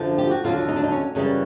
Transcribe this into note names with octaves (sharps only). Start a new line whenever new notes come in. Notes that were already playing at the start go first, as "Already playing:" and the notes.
Already playing: F#2 D3 F3
G4
F#4
D#2 D3 F#3 F4
D#4
D4
D#4
C#4
F#2 C#3 E3 G3